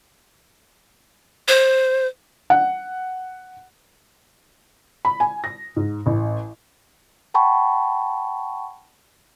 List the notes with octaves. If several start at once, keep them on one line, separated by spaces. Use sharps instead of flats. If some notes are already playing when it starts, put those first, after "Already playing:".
C5
F#5
B5
G#5
A#6
G#2
A1
F#5 G5 A5 B5 C#6